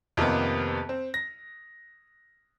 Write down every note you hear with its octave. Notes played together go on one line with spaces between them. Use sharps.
F2 C3 D#3 A#3 B3
C4
A#6